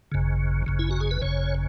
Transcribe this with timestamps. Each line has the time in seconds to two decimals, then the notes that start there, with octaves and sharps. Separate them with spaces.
0.12 G#1 F#2 C#3
0.66 G#1 F#2 C#3
0.79 E4
0.91 F#4
1.00 G#4
1.11 B4
1.21 G#1 F#2 C#3 C#5